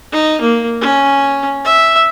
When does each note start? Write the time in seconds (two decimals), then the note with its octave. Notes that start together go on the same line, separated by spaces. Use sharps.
0.12 D#4
0.41 A#3
0.81 C#4
1.64 E5